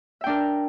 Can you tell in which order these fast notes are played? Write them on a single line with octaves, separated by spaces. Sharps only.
E5 G5 D4 A#4